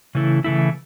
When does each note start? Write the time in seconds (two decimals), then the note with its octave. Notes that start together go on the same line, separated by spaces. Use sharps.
0.15 C#3 E3 A3 E4
0.44 C#3 E3 A3 E4